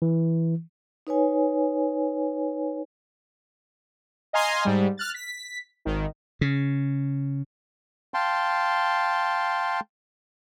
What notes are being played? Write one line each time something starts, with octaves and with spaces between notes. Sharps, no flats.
E3
D#4 B4 C#5 G#5
D#5 F5 G#5 A#5 C6
G#2 G3
F6 F#6 A6
B6
G#1 D#3
C#3
F5 G5 A5 C6